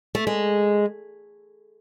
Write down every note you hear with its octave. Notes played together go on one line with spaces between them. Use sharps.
A3
G#3